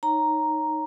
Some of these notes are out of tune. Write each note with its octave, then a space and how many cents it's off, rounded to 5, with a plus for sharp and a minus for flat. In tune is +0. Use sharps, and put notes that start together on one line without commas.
D#4 +0 C#5 +0 A#5 +0